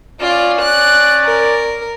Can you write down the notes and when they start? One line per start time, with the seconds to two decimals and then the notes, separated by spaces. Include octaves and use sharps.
0.21 C#4 F4 D5
0.61 F#6
1.25 A#4